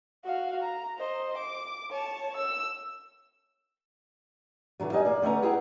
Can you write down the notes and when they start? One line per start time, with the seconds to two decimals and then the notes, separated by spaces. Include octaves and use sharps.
0.24 F#4 F5
0.62 A#5
0.99 C5 D#5
1.38 D6
1.92 C#5 A5
2.37 E6
4.80 D3 E3 F#3 A3
4.91 E2 G3 D#4 D#5 G#5
5.05 A#3 D5
5.22 D3 A3 B3 C#4 A#5
5.42 E4 G#4 B4 F#5 G5 A#5